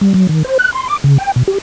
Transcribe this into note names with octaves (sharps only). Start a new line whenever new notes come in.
G3
F#3
D#3
C5
F#6
C6
D6
C#3
G5
B2
G4